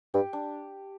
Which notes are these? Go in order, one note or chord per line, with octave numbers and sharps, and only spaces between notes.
G2 G4
D4